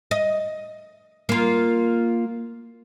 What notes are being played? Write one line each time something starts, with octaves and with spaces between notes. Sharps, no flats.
D#5
A#3 F4